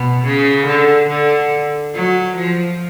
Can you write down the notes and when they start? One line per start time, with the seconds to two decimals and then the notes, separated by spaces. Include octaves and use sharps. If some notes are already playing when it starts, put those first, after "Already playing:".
Already playing: B2
0.25 C#3
0.67 D3
1.09 D3
1.94 F#3
2.36 F3